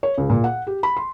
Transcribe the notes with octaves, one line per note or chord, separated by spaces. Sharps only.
C#5
C#2
A#2
F#5
G4
B5
C6